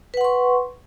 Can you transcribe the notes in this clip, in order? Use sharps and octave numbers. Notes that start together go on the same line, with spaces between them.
B4 F#5 C6 C#6